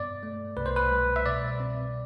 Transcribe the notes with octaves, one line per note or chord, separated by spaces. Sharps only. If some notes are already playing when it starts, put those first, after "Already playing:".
Already playing: G2 B3 D5
A3
C2 B4
C5
B4
G3
E5
B2 D5
C4